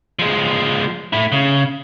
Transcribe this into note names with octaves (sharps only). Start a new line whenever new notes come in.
F3 G#3
A3 E4
C#3